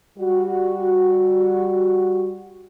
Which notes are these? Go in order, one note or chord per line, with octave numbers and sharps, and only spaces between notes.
G3 F#4